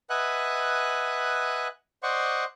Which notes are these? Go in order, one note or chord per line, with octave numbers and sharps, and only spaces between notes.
B4 D#5 E5 F#5 G#5 F#6
C5 D5 D#5 F#5 C6 C#6